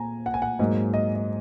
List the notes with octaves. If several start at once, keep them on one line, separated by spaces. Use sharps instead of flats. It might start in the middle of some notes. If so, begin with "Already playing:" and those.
Already playing: A#2 G#5 A#5
F#5
G#5
F#5
G#2 F#3 A#3 D#5
D#5
D#5